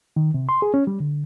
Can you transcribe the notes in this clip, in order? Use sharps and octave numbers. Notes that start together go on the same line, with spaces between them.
D#3
C3
C6
G#4
C#4
G3
D3